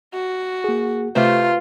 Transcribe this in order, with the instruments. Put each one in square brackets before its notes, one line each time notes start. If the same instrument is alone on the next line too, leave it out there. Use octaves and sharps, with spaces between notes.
[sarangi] F#4
[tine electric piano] A#3 G#4
[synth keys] C3 A3 C5 [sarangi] F4 [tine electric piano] B4